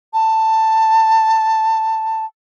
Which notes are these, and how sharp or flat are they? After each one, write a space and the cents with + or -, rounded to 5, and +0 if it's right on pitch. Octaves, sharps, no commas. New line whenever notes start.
A5 +10